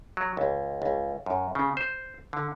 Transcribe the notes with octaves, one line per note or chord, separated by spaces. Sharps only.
F#3
C#2
C#2
F#2
C#3
C5
D3